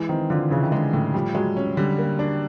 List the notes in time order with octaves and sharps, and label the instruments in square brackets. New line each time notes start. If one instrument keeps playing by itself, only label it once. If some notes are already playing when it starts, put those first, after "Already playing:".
Already playing: [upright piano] E3 [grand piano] G#3
[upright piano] D#3 [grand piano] C4
[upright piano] D3 [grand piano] F4
[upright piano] C#3 [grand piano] E3
[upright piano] D#3
[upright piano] D3 [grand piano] G#3
[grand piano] A2 [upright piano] D#3
[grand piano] F3 [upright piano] G3
[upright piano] F#3 [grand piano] G#3
[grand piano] C#4
[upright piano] D3 [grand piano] G3
[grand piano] A#3
D4